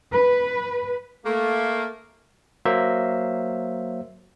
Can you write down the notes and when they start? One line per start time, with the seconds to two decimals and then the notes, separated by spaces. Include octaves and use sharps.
0.14 B4
1.25 A3 A#3
2.66 F#3 A#3 C5 E5